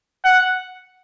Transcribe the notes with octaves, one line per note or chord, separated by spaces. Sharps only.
F#5